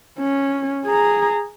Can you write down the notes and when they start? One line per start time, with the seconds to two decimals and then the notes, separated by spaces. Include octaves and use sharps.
0.19 C#4
0.86 G#4 A#5